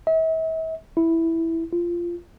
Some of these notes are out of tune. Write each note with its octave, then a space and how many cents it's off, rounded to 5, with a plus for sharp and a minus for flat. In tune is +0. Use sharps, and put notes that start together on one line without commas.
E5 -40
E4 -5
F4 -15